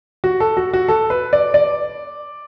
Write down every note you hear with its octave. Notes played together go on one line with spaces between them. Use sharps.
F#4
A4
F#4
F#4
A4
B4
D5
D5